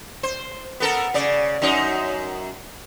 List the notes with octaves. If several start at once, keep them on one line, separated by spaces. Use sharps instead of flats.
C5
B3 A4 A#4
C#3 D5
F#2 D#4